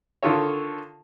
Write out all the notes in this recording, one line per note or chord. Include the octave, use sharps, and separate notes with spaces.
D3 D#3 F4 A4 C#5